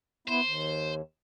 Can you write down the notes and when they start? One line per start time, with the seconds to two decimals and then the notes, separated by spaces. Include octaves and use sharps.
0.28 B3 E4 C5
0.43 D#2